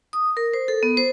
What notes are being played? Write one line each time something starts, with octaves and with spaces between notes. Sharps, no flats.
D#6
A#4
C5
A4
B3
C5